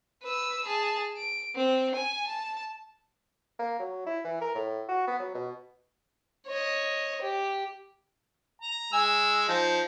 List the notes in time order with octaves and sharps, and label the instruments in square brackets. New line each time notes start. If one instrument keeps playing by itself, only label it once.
[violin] B4 E6
G#4 A5
D7
C4
G#5
A5
[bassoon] A#3
F#3
E4
E3
A#4
A2
F#4
B3
F#3
B2
[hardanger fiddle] C#5 D#5
G4
[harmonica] A#5
G#3 G#5 E6
F3 D#4